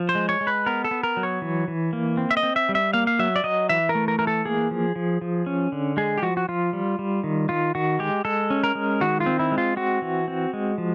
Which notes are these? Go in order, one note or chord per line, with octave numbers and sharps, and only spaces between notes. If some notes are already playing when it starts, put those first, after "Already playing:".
Already playing: F3
C5
G#3
C#5
G#3
B4
B3 A#4
A4
B3
A#4
F#3
C#5
E3
E3
A#3
C4
E5
D#5
C4
E5
G3
E5
A#3 F5
F5
F#3 E5
D5
F#3 D#5
E3 E5
A#4
A3
A#4
E3 A#4
A4
A#3 G#4
F3
F3
F3
C#4
D3
G#3 G#4
G4
F3 F#4
F#4
F3 F4
G3
G3
D#3
D#3 F4
D#3 F#4
G#3 G4
G#3 A4
C#4
A#4
G#3
D#3 F#4
F4
C4
E4
G#3
F4
C4 F#4
E3
C4
G#3
F3